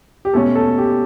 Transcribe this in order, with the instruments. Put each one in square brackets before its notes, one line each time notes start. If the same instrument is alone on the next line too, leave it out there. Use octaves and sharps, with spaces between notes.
[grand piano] G4
B2 A3 C#4 A4
A4
G4